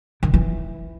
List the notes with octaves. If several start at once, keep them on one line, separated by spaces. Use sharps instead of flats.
D#3
E3